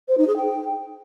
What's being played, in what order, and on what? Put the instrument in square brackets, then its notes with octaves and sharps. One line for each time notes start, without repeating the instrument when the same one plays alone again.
[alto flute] C5
D#4
G#4
G5